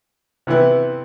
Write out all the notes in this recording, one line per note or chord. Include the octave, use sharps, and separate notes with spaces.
C3 E3 B3 E4